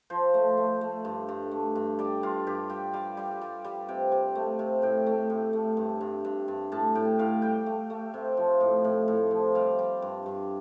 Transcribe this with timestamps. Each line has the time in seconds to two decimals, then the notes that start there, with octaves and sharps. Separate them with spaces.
0.10 F3 C5
0.34 A3
0.57 A3
0.81 A3
1.05 G2
1.29 G2
1.51 A3
1.75 G2
1.99 G3 D5
2.23 G2 F4
2.47 G2 G4
2.70 G3 G5
2.93 G3 F5
3.17 G3
3.41 G3
3.65 G3
3.88 C3 G5
4.12 C3
4.35 A3
4.59 C3
4.82 A2 G5
5.06 A3
5.30 A2
5.53 A3
5.77 G2
6.01 G2
6.25 G2
6.48 G2
6.72 A2 A5
6.95 A2 G5
7.19 A2 F5
7.42 G3 G5
7.66 A3
7.90 A3
8.14 C3
8.37 F3
8.61 A2
8.84 A2
9.08 A2
9.31 F3
9.55 G3 F5
9.79 G3
10.02 G2
10.26 G2